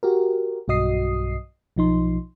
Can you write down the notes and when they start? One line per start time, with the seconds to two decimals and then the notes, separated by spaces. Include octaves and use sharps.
0.03 F#4 G4 A#4
0.68 B1 G2 F#4 D#5 D#6 C7
1.76 B1 F3 D#4 C6